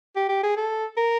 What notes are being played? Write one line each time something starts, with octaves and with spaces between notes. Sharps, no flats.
G4
G4
G#4
A4
A#4